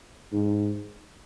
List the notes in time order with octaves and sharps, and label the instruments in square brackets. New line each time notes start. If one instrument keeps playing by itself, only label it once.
[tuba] G#2